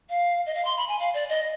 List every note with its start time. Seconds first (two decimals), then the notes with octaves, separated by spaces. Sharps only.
0.10 F5
0.46 D#5
0.54 F5
0.65 C6
0.77 B5
0.88 G#5
0.99 F5
1.14 D5
1.29 D#5